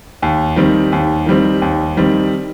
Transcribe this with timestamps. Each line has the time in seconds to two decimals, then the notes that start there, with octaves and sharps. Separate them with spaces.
0.22 D#2
0.56 D#3 G3 C4
0.92 D#2
1.26 D#3 G3 C4
1.62 D#2
1.97 D#3 G3 C4